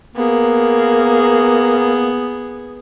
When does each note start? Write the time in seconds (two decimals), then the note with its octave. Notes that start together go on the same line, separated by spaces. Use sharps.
0.15 A#3 B3 G#4